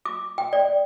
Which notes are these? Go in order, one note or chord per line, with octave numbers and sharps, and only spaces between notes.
D6
G5
D5